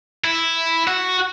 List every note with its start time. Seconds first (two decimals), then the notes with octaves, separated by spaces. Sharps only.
0.24 E4
0.88 F#4